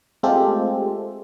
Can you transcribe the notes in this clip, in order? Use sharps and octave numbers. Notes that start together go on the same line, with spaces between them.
G#3 A3 C4 F4 G4 A4